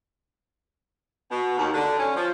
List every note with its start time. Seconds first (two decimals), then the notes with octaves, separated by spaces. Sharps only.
1.31 B2
1.58 D#2
1.73 D3
1.98 C#4
2.16 F3